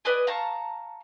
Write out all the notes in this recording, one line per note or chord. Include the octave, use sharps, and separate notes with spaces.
B4 D5 D#5 G#5
F5 A5 A#5 C#6